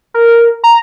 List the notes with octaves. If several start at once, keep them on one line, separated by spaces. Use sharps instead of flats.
A#4
A#5